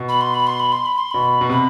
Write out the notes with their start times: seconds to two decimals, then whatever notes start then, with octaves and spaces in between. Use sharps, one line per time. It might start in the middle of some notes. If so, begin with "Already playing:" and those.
Already playing: B2
0.09 B5
0.21 C6
0.34 B5
0.47 C6
0.60 B5
0.72 C6
0.86 B5
0.98 C6
1.11 B2 B5
1.41 B2
1.49 C3 B5